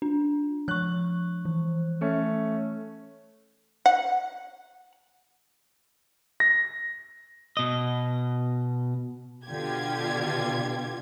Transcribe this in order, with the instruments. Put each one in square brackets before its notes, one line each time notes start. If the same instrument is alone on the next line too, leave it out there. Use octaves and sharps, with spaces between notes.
[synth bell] D4
[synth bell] F3 C#6 [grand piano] F#6
[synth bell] E3
[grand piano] A3 C#4
[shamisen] F#5
[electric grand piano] A#6
[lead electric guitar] B2 D#5
[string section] B2 D3 F4 G4 G#6